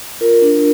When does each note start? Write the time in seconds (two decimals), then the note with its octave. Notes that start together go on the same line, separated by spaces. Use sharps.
0.21 F4 A#4
0.42 D4